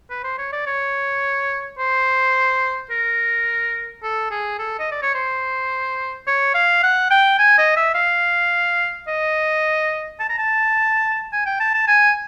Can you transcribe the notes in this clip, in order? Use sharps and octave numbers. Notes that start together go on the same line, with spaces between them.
B4
C5
C#5
D5
C#5
C5
A#4
A4
G#4
A4
D#5
D5
C#5
C5
C#5
F5
F#5
G5
G#5
D#5
E5
F5
D#5
A5
A#5
A5
G#5
G5
A5
A5
G#5